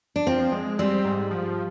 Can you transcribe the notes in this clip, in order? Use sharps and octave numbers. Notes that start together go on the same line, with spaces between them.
D4
F3 C4
G#3
G3 C4
G#2
F3